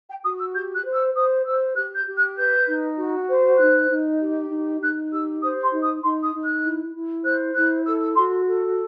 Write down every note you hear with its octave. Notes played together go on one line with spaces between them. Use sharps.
G5
F#4 D#6
E6
G4 G6
F#6
C5
E6
C5 D#6
C5 E6
G4 F#6
G6
G4
F#6
B4 G6
D#4
F#4
C5
D#4 F#6
D#4
G4
D#4
D#4 F#6
G4 E6
C5 D#6
C6
D#4
D#6
D#4 C6
D#6
D#4
F#6
E4
E4
C5 F#6
E4 F#6
A4 E6
E6
F#4 C6
A4